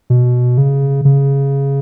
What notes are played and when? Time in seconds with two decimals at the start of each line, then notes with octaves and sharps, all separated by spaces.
0.10 B2
0.58 C#3
1.05 C#3